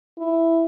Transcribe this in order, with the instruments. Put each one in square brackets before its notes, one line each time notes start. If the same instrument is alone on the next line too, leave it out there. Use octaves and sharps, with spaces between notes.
[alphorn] E4